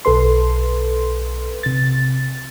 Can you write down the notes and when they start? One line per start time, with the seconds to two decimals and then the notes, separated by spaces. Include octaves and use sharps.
0.05 B1 A4 B4 C6
1.63 C3 A6